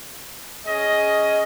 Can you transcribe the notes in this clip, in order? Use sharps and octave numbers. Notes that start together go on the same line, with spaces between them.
C#4 G#4 D#5